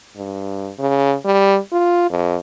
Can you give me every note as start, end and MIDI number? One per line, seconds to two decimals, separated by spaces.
0.16 0.70 43
0.79 1.15 49
1.25 1.58 55
1.72 2.05 65
2.10 2.37 41